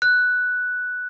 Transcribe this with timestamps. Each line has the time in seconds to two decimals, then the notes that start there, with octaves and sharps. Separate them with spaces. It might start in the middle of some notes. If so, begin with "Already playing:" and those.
0.02 F#6